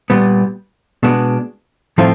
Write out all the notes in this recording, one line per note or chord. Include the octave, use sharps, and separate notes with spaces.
A#2 G3 B3
B2 G#3 B3 D4
A2 F3 A3 C4 F4